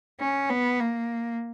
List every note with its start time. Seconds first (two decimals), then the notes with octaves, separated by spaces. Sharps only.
0.20 C#4
0.50 B3
0.80 A#3